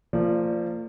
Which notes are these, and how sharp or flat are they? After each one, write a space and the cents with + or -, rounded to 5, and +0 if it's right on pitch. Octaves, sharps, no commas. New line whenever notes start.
F3 -15 A#3 -40 D5 +0